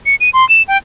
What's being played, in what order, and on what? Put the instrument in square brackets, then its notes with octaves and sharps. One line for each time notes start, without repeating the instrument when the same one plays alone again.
[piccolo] C#7
D#7
C6
E7
G5